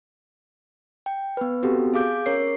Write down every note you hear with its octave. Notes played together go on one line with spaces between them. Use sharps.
G5
B3 B4
B3 C4 F#4 G4 A4
G#4 F5 D6 G6
C#4 A#4 C#5 C7